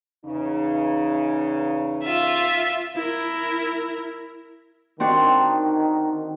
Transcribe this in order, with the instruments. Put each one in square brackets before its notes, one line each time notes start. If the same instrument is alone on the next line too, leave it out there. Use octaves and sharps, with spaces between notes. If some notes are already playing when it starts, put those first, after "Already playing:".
[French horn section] E2 C#3 D#4
[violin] F4 E5
[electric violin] E4 A#4
[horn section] D#3 [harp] C4 D4 F#4